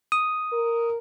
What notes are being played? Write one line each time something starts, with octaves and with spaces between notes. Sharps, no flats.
D#6
A#4